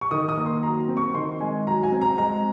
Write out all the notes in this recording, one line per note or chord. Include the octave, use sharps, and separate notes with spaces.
C#6
D#3 D#6
D#6
A#3
C6
F#3 A#5
C4
C#6
D#3 C6
G#3 G#5
F#3 A#5
G#5
C4
A#5
G#3 A#5